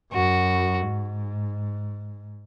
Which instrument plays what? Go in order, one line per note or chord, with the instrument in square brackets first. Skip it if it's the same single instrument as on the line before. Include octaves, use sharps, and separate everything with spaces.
[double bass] F#2 [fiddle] F#4
[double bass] G#2